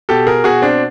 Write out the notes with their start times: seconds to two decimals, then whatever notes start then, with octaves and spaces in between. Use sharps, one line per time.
0.09 B2 G4 A4
0.27 G#4 A#4
0.44 B2 F#4 G#4
0.62 C4 D4